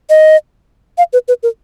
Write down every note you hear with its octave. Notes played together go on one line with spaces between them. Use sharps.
D#5
F5
B4
B4
A#4